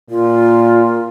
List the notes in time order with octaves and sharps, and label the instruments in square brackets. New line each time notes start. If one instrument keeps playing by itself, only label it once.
[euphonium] A#2 [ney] F4